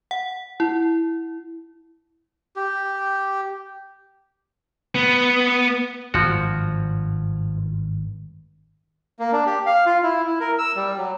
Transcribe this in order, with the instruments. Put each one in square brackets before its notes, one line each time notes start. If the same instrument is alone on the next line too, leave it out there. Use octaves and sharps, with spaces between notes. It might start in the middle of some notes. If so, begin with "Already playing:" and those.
[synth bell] F#5
E4
[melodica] G4
[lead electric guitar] B3
[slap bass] G#1 G2 [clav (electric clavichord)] F3 F#4
[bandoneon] A#3
D4
G4
F5
F4
E4
E4
A#4
E6
G3
F#3